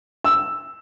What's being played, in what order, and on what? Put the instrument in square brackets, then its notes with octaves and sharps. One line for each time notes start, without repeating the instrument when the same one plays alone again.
[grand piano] E6